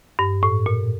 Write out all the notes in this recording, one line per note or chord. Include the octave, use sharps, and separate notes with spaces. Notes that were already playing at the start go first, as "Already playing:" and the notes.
G2
A2
A#2